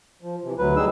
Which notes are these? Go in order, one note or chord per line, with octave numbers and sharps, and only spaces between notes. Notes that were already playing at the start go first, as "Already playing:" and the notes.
F3
C3 E3
D2 F#3 B4
F#3 G3 D#4 G#4 E6